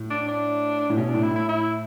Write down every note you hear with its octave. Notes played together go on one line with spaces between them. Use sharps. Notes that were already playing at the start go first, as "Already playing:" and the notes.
Already playing: A2
D4
D4
A2
B2 C#4
A2 D4
E4
A2
E4
E4